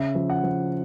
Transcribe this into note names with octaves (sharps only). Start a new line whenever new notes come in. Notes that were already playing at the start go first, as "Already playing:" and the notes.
Already playing: C#3 E5
F3
F#5
F3